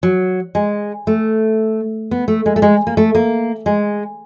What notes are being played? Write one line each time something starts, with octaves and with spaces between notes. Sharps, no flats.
F#3
G#3
A3
B3
A3
G#3
A3
G#3
A#3
A3
A#3
G#3